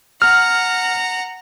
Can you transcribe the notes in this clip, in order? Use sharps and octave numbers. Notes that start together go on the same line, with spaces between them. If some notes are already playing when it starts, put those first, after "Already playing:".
F#5 A#5 F6